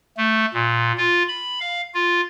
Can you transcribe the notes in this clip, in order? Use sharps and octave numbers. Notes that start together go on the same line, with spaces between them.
A3
A#2
F4
B5
F5
F4